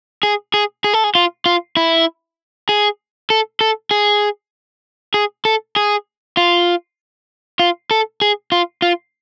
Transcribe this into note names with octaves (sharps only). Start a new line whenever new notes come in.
G#4
G#4
G#4
A4
G#4
F4
F4
E4
G#4
A4
A4
G#4
G#4
A4
G#4
F4
F4
A4
G#4
F4
F4